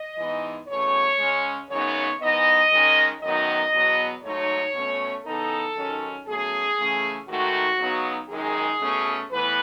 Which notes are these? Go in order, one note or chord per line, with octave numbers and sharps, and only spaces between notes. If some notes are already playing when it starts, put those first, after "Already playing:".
Already playing: D#5
G#2 E3 B3 D#4
E2 B2 A3 C#4 C#5
C#3 G#3 C#4
F#2 C#3 G#3 B3 D#4 C#5
G#2 E3 B3 D#4 D#5
D#3 G#3 C#4
F#2 D#3 F#3 B3 D#4 D#5
E2 B2 F#3 B3
G#2 F#3 A3 D#4 C#5
B2 A3 C#4
C#3 E3 B3 D#4 A4
G#2 D#3 F#3 C#4
B2 F#3 A3 C#4 G#4
C#3 E3 A3 C#4
G#2 D#3 A3 F#4
C#3 F#3 B3 D#4
F#2 D#3 G#3 D#4 G#4
B2 A3 C#4
A2 E3 B3 B4